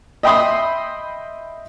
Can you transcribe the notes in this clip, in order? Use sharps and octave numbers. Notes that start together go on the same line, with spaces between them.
D#5 E5 G5 B5 C6 D#6